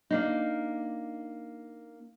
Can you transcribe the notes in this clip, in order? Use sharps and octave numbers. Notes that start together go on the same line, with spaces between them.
A#3 D4 D#4